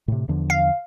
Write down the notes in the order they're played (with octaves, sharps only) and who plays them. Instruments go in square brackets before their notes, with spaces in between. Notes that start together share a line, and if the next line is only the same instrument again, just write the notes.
[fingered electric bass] A2 C3
E2 D3 F3
[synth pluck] F5